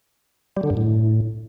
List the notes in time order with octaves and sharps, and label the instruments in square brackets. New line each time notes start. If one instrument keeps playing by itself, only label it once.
[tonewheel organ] G3
D3
G2
A2